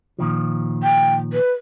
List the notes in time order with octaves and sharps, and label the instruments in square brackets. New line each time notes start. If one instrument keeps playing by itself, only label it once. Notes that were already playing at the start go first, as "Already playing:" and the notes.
[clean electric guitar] A#2 D#3 F3
[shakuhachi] G5
B4